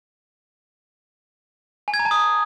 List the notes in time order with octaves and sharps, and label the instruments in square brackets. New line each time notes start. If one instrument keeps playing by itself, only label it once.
[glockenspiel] G#5
G#6
A#5
A5
D#6